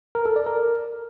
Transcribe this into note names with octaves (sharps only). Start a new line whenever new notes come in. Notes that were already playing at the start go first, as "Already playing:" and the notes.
A#4
A4
D5
A#4